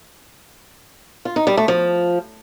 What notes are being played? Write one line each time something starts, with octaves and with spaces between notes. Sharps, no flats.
F4
D#4
G3
A3
F3